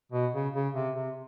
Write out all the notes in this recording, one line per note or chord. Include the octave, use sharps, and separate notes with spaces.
B2
C#3
C#3
C3
C3